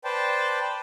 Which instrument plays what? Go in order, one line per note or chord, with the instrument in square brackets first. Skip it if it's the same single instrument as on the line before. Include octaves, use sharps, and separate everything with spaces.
[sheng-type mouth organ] B4 C5 D5 G5 A5